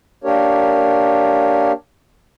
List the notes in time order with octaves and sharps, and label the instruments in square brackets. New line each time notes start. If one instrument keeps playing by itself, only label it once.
[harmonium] A#3 D4 G4 A#4 C#5